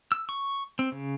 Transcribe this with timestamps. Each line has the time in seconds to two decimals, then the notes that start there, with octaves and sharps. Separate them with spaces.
0.12 E6
0.29 C#6
0.79 C4
0.92 C#3